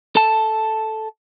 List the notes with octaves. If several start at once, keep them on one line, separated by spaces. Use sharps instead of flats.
A4 A5